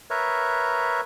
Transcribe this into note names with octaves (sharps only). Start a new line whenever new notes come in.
A#4 B4 C#5 E5